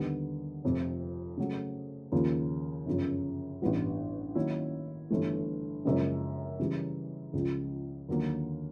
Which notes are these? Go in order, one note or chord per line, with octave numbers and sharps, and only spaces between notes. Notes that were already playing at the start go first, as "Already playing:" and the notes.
Already playing: D#2 D3 G3 B3
F1 F2 C3 F3
C#3 F#3 A3
D#2 C#3 F3 A#3
G1 F#2 C#3 F3
A1 G2 E3 G3 B3
D#3 F#3 A#3 C#4 E4
G1 G2 E3 A3
F#1 F#2 C#3 F3 G#3
C#3 E3 G3
C#2 C#3 F3
D#2 D3 F#3 A#3